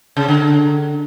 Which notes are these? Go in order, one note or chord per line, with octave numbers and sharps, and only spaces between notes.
C#3
D3